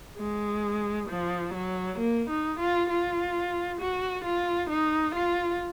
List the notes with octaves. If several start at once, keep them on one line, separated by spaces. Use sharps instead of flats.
G#3
F3
F#3
A#3
D#4
F4
F4
F#4
F4
D#4
F4